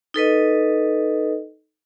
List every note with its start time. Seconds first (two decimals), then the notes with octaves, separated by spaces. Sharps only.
0.14 D#4 A4 B4 D#5